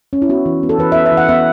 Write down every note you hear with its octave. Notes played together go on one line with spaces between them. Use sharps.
C#4
E4
B3 F#4
E3
B3
A4
E3 B4
B3 E5
E5
E3
F#5
B3 E5